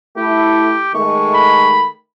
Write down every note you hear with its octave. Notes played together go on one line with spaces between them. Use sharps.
A3 E4 G4
D#3 G#3 A3 C#6
B5